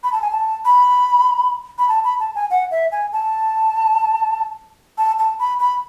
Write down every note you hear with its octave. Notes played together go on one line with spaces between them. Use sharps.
B5
A5
G#5
A5
B5
B5
A5
B5
A5
G#5
F#5
E5
G#5
A5
A5
A5
B5
B5